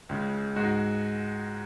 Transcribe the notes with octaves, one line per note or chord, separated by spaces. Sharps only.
C#2 C#3 G#3
G#2 G#3 F#4